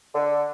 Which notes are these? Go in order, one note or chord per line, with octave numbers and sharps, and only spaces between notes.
D3